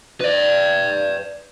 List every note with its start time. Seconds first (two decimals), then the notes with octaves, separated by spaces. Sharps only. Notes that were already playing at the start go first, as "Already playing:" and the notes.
0.21 B4 D5